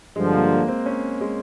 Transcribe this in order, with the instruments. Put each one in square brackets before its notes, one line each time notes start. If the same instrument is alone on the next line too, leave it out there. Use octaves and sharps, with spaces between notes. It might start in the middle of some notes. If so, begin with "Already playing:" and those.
[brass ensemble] G2 D3 F3 [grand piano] G#3
[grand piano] A#3
A#3
C4
C#4
G#3